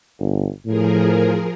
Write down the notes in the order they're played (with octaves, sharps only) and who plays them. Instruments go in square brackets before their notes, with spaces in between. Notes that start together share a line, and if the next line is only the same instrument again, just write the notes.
[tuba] G1
[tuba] A2 [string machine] F3 G#4 A#4